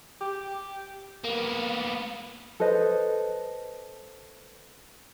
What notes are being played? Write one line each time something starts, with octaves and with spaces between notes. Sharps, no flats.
G4 G5 D6
A#3 B3
A4 B4 C5 D#5